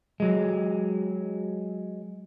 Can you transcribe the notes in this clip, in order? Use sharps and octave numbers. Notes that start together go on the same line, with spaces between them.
F#3 G#3